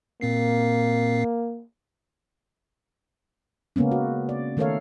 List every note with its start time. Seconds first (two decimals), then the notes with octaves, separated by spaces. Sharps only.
0.21 A#2 A#3 C4 C7
3.76 C#3 G#3 A#3 B3 C#4
3.91 F#4
4.29 D5
4.57 D#3 A3 A4 A#4 C#5 F5